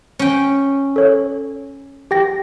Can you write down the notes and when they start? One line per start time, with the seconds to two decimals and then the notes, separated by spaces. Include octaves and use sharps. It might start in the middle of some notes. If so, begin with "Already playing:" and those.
0.19 C#4 G5
0.96 A4 C#5
2.11 G4 G5 A#6